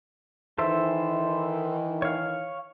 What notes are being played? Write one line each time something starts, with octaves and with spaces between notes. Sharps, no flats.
D#3 E3 A4 C5 E5
C#5 F5